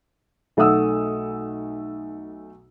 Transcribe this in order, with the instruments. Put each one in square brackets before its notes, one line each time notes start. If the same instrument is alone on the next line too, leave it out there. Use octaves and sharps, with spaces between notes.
[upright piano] B1 A3 E5 F#5 D#6 E6